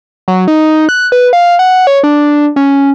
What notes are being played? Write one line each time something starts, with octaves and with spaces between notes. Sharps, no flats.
F#3
D#4
F#6
B4
F5
F#5
C#5
D4
C#4